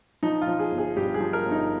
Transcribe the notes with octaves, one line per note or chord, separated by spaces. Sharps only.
F3 D#4
F4
F3
G#4
G1
G#4
G2 G4
G#4
F3
A#4
G1
D#4